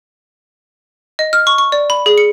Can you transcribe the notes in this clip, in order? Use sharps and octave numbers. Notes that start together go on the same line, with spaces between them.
D#5
F6
C#6
C#6
D5
B5
G#4
C#7